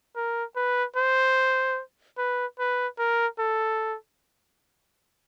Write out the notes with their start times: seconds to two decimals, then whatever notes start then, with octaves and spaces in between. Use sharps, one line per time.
0.16 A#4
0.56 B4
0.96 C5
2.18 B4
2.59 B4
2.98 A#4
3.39 A4